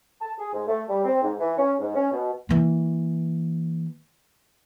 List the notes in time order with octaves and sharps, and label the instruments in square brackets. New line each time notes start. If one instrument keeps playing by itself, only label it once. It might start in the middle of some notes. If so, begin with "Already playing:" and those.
[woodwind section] A5
G#4
G#2
A3
G3
C4
G#2
E3
C#4
G#2
C#4
B2
[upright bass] E3 A#3